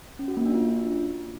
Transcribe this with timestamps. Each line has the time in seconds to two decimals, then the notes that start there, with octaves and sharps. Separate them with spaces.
0.19 C#4
0.28 F#4
0.37 A#3
0.46 D4
0.54 F4